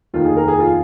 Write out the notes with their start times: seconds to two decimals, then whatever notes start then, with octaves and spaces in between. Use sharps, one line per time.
0.14 F1 D#2 D#3 F4
0.25 G#4
0.37 A#4
0.48 G#4
0.60 F4